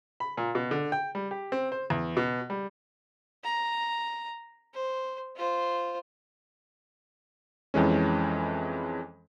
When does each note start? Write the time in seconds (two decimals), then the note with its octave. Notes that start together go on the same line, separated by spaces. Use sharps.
0.20 B5
0.37 A#2
0.55 B2
0.71 D3
0.92 G5
1.15 G3
1.31 G4
1.52 C4
1.72 C5
1.90 E2
2.17 B2
2.50 G3
3.44 A#5
4.74 C5
5.36 F4 C5
7.74 F2 E3 G#3 C#4